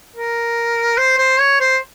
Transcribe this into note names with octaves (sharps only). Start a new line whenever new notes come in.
A#4
C5
C5
C#5
C5